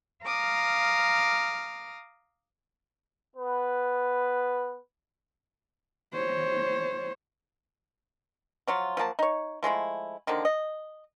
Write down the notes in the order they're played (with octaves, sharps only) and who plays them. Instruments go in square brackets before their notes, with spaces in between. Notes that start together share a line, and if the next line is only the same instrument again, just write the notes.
[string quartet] F5 A#5 D6 D#6 F6
[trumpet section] B3 B4
[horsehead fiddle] C5 C#5
[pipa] F3 F#3 F4
F3 F#3 A#3 A5
D#4 C#5
F3 G#3 A3 E4
D3 D#3 F3 A#3
D#5